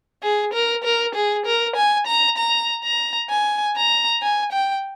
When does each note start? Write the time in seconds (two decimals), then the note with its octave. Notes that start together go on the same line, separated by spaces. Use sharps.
0.23 G#4
0.54 A#4
0.84 A#4
1.15 G#4
1.46 A#4
1.76 G#5
2.07 A#5
2.37 A#5
2.84 A#5
3.30 G#5
3.76 A#5
4.22 G#5
4.52 G5